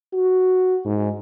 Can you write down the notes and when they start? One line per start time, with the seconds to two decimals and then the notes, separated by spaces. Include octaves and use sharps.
0.13 F#4
0.85 G#2